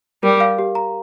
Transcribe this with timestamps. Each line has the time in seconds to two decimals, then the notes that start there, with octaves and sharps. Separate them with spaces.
0.23 G3 A#4
0.40 F5
0.59 G4
0.75 A#5